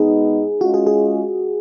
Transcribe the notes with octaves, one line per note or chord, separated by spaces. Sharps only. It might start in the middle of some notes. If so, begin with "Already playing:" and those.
Already playing: B2 G#3 B3 D#4 G#4
G#3 C#4 F4 F#4
G#4
G#4